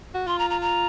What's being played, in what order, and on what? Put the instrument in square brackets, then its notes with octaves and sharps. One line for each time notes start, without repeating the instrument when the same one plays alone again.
[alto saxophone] F#4
[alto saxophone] F4 [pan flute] C6
[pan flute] A#5
A#5
A#5